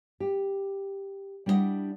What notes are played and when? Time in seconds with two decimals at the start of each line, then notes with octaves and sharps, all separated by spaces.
0.20 G4
1.46 G3 D4 E4 G#4 D#5 F#5